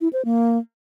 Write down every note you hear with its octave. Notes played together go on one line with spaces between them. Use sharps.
E4
C5
A#3